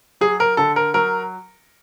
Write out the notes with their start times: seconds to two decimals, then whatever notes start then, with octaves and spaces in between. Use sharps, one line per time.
0.21 F#3 G#4
0.40 A#4
0.57 D3 A4
0.76 A#4
0.94 F#3 A#4